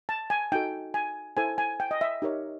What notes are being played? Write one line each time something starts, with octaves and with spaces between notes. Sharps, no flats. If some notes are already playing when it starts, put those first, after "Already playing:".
A5
G#5
D#4 F#4 A4 G5
G#5
E4 A4 C5 G#5
G#5
G5
D#5
E5
D#4 G4 A#4 C#5